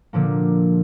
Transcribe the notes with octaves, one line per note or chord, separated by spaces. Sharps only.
A#2 D3 F3 A#3